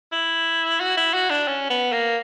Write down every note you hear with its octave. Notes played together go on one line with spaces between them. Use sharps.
E4
F#4
E4
F#4
D4
C#4
B3
A#3